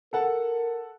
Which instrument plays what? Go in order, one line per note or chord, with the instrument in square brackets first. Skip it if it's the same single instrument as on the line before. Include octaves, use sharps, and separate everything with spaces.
[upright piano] A4 F#5 A5 [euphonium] A#4